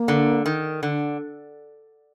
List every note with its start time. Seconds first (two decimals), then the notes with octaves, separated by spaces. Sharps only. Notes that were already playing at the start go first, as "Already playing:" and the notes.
Already playing: A#3
0.08 D3
0.46 D#3
0.83 D3